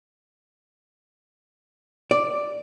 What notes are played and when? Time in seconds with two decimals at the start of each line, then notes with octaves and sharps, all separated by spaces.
2.11 D5